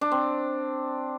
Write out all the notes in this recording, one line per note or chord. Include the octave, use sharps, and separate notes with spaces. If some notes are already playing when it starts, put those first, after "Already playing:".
D4
C4